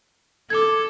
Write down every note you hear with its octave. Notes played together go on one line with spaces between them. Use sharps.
A4 D6 G#6